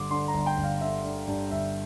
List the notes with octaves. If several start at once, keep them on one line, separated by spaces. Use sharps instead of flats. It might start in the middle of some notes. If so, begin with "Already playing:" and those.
Already playing: G1 G2 D3 C6 D6
D3 C6
A#5
G1
G5
G1
F5
D3 E5
D3
G2
G1 E5